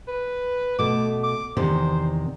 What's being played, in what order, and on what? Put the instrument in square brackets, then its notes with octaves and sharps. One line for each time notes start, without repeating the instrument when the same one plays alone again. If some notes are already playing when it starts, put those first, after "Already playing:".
[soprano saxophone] B4
[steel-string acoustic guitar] B2 A3 [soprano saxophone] D6
[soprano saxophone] D6
[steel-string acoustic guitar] E2 C3 D#3 [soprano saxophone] C5